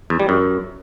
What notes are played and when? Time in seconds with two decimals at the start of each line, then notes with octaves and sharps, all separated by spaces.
0.10 E2
0.20 G3
0.29 F#2